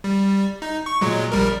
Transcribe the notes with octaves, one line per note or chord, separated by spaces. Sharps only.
G3
D#4
C#6
A#2 F#3 G#3
A#1 G3 A#4